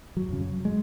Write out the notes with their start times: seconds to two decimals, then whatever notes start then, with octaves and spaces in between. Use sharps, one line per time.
0.17 F#3
0.29 F#2 C#3
0.41 F#3
0.65 G#3